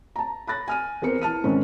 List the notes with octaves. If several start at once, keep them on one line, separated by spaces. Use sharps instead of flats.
A5 A#5
B5 F#6 A6 A#6
G#5 F6 D#7
E2 C4 A#4 C5 C#7
E3 A5 F6 D#7
G#2 D#3 C4 C#4